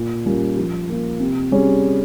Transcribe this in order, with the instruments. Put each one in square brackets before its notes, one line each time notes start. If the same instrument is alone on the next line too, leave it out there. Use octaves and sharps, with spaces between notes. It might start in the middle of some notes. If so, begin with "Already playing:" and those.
Already playing: [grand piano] A#2
G3 C#4 F4 A#4
F3
A#3 F4
C3
G3 C#4 G#4 C#5